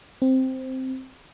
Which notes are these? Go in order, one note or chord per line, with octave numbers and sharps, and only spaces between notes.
C4